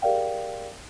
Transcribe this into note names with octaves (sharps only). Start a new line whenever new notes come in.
G4 G#4 A#4 D5 F5 G5